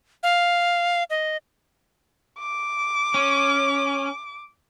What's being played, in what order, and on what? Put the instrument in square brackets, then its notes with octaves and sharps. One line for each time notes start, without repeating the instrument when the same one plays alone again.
[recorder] F5
D#5
[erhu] D6
[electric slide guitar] C#4